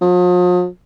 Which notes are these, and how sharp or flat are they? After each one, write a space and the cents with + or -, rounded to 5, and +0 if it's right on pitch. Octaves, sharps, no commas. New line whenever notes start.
F3 +45